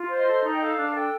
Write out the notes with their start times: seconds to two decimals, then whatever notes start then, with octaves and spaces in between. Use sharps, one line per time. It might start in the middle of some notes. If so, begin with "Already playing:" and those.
Already playing: F4
0.10 C5
0.16 D#5
0.27 A4
0.44 D#4
0.52 G5
0.61 A4 F5
0.77 D4
0.87 A5
0.94 A4 G5